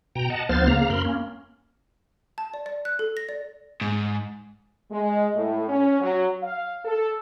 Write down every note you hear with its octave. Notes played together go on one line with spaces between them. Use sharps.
B2 G5 A#5
D#5 F#5 A5
D2 F3 B3 C5 F6 A6
C#3 A#3 F5 A#5
F#2 A#4 B5 C6
A#3 C#4
A5
D5
D5
F#6
A4
A#6
D5
G#2
G#3
A2
C#4
F#3
F5
A4